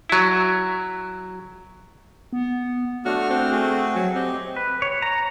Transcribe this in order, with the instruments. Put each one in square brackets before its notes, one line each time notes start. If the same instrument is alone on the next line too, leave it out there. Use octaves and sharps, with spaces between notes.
[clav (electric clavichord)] F#3 E4
[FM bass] B3
[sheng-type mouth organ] A3 D4 F6 [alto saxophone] F#4
[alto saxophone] C4
[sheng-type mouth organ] A3 F#4 G#4
[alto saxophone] F#3 [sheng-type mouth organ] A3
[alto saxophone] C4 [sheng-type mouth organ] G4 D#5
[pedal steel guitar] B4
C#5
A#5